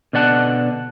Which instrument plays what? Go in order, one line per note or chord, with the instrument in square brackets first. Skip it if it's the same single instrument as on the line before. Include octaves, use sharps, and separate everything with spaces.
[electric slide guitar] B2 D3 D5 F#5 A5